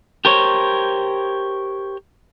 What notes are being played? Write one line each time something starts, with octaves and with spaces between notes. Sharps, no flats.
G4 A#4 C5 C#5